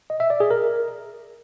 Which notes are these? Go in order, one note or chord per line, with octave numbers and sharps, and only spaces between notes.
D#5
E5
D5
G#4
A#4